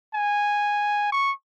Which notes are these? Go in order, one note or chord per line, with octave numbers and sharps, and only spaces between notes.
G#5
C#6